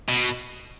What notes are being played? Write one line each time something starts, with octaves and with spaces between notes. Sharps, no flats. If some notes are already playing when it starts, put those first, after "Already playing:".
B2